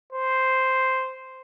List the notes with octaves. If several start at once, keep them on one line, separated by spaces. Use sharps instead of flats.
C5